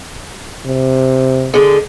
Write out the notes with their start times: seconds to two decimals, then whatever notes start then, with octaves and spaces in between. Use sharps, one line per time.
0.66 C3
1.54 D3 G#3